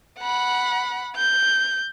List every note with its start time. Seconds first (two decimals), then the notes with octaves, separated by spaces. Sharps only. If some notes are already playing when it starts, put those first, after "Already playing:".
0.19 F#5 B5
1.16 G6